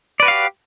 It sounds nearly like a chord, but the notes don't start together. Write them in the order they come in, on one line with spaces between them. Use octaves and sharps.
D5 B4 F#4 F5 G4